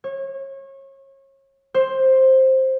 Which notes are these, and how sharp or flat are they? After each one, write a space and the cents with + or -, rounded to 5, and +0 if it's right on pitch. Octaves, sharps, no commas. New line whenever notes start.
C#5 -30
C5 +10